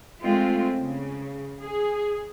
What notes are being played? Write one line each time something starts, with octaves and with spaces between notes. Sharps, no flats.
G#3 A3 C4 F4
C#3
G#4